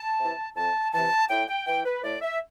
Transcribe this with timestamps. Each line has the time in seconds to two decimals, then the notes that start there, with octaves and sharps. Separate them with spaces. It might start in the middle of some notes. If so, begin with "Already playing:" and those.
Already playing: A5
0.20 C3 E3
0.56 F2 A5
0.93 C3 E3 A5
1.30 A2 G5
1.48 G5
1.67 E3 G5
1.85 B4
2.03 A2 D5
2.21 E5